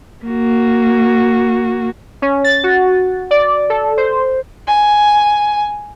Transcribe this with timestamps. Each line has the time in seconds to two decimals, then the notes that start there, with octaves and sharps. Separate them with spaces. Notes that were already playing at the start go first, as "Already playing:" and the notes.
0.25 A#3 F#4
2.22 C#4
2.44 A6
2.64 F#4
3.31 D5
3.70 A4
3.97 C5
4.67 G#5